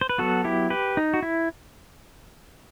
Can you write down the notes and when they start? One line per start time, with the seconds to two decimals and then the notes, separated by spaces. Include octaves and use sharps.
0.01 C5
0.09 B4
0.18 F#3 B3 F#4 A4
0.44 E4 G4
0.70 G4 B4
0.97 D#4
1.14 F#4
1.23 E4